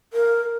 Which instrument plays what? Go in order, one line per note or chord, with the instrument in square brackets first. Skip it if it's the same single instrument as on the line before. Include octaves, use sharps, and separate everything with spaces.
[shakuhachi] A#4